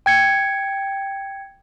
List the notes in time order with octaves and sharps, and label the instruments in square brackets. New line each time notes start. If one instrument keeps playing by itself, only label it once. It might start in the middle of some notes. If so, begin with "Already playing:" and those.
[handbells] G5 G#6 C#7